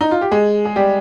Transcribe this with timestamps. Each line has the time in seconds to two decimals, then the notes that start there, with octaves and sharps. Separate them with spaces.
0.01 D#4
0.11 F4
0.21 G4
0.31 G#3 G#4
0.65 G#4
0.76 G3 G4